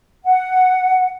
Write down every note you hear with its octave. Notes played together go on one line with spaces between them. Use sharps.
F#5